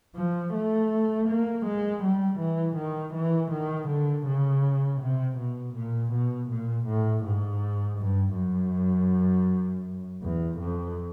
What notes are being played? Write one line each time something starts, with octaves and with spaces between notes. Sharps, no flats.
F3
A3
A#3
G#3
G3
E3
D#3
E3
D#3
D3
C#3
C3
B2
A#2
B2
A#2
A2
G#2
G2
F#2
E2
F2